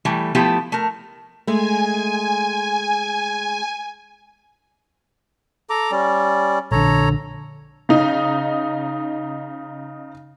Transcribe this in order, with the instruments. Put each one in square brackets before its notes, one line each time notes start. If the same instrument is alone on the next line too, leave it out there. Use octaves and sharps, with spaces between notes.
[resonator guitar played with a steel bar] E3 G3 A3
F3 A3 B3 E4 G4
A3 A#4
[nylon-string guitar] G#3 A3 [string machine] G#5
[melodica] A4 A#5 D6
G3 C#4 D5
[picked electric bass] A#1 D3 [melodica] A4 C#5 A#5
[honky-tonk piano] C#3 D#4